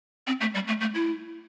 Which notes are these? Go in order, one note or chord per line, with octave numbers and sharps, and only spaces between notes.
C4
A3
G3
A3
A3
E4